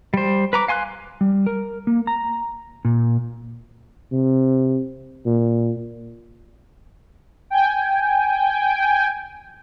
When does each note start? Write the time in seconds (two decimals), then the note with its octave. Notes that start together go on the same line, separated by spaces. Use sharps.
0.14 G3 C5
0.53 B4 A#5 D6
0.68 F5 G#5 C6 D6 F#6
1.21 G3
1.46 A#4
1.87 A#3
2.07 A#5
2.85 A#2
4.12 C3
5.26 A#2
7.50 G5 G#5